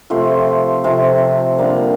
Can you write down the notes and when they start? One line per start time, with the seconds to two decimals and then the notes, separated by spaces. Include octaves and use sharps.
0.10 C3 F3 A3 C5
0.84 C3 F3 A3
1.58 D3 G3 A#3 D5